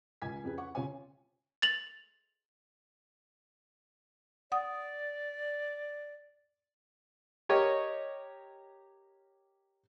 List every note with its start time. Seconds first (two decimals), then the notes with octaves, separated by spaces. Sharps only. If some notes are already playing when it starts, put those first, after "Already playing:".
0.22 C#2 G#5 G#6 B6
0.43 F2 C#4 G#4 B4
0.58 F#5 C#6
0.75 C#3 F4 C#5 G#5
1.62 A6 F7 F#7
4.52 D5 F#5 D#6
7.49 G4 A#4 C#5 D#5